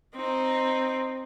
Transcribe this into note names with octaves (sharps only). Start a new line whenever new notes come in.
C4 D#4